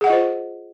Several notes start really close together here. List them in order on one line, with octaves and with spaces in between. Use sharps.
G#4 F#5 D#5 F4 C5